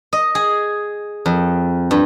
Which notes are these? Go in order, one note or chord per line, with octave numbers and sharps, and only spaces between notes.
D#5
G#4
F2
G2